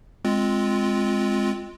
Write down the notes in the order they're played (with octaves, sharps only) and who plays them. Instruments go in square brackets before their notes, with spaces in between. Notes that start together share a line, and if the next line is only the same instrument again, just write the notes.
[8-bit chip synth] G#3 C4 F4